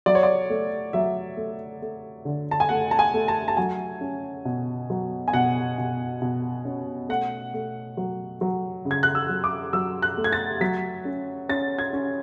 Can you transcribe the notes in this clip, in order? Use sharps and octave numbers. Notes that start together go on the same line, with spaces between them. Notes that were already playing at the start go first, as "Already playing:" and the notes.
F#3 D5
C#5
D5
A3
F#3 E5
A3
A3
D3
A5
G#5
A3 F#5
A5
G#5
A3
A5
A5
F#3 G#5
C#4
B2
F#3
G#5
B2 F#5
B2
B2
C#4
A3 F#5
A3
F#3
F#3
C#3
G#6
F#6
E6
F#3
D6
F#3 E6
F#6
A3
G#6
A6
F#3 B6
C#4
C#4 A6
G#6
C#4